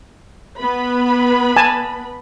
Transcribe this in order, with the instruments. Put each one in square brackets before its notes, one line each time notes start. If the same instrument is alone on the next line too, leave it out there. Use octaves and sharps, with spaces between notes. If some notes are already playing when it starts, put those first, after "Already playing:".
[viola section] B3 B4 B5
[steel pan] G#5 A5